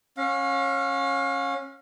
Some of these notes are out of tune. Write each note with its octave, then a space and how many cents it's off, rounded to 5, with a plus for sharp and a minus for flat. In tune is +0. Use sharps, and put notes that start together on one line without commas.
C#4 -20 F5 +35